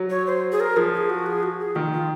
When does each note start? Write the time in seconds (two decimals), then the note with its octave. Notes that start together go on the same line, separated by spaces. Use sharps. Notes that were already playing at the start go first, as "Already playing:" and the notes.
Already playing: F#3
0.10 C#5
0.27 C5
0.52 G#4
0.60 A#4
0.77 F3 G#4
0.93 G#4
1.10 F#4
1.26 G#4
1.43 F#4
1.59 G#4
1.75 D#3 F4
1.93 F4